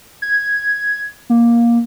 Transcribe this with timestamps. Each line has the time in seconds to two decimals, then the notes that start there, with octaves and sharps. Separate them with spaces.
0.22 G#6
1.30 A#3